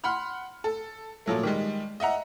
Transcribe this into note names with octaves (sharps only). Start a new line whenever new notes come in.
F#5 B5 C6 F6
A4
A#2 F3 F#3 A3
D#3 G3 G#3
D#5 E5 F#5 A#5